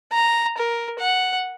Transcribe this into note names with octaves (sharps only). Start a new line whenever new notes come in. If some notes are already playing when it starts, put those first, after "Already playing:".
A#5
A#4
F#5